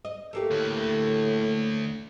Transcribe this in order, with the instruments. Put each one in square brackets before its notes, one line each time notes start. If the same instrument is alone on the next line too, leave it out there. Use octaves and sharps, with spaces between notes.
[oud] D#5
A3 A#3 G4
[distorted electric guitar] D2 [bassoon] A2